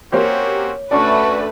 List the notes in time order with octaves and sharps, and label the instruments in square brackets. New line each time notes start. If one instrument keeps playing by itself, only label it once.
[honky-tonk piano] A#3 G4 C5 [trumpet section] C4 C#4 F#4 [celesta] C#5
[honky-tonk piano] D2 C#4 D5 [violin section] A3 B4 [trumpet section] F#4 [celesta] A5 C#6